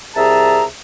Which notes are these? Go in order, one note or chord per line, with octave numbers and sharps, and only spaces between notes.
C2 G#4 E5 A5 A#5